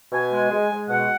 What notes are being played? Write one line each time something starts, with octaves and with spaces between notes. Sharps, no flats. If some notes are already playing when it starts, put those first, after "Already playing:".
B2 G#5
G#3
G#3
G#3
B2 F#5